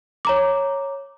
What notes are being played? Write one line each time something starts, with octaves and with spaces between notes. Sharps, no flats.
C#5 A#5 D6